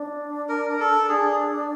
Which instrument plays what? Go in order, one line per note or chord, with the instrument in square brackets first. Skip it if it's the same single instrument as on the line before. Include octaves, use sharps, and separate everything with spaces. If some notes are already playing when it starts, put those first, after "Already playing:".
Already playing: [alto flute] D4
[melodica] A#4
A#4
A4
[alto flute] D4 [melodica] G#4